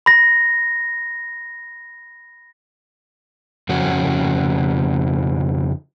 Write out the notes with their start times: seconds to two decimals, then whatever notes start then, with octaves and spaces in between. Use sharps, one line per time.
0.06 B5 A#6
3.69 F2 C#3 C#4 F#4